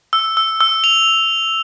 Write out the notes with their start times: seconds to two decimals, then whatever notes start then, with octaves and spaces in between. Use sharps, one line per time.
0.13 E6
0.37 E6
0.61 E6
0.84 F7